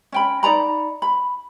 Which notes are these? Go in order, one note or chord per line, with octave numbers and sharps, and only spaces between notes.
C#4 G5 B5
D#4 D5 A#5 B5
B5